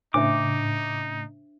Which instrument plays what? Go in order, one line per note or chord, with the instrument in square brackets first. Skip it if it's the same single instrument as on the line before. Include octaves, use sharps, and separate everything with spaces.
[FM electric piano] A2 C#3 [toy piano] D4 C5 E5 [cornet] D#4 [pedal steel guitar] D6